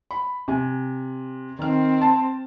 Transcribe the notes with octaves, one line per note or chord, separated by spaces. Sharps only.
B5
C3 G#5
D#3 C4 F6
A5